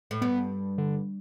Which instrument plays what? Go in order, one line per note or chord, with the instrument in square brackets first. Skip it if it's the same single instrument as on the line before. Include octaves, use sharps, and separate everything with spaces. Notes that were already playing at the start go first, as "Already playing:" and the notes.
[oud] A2
[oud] G2 [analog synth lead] B3
[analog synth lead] D3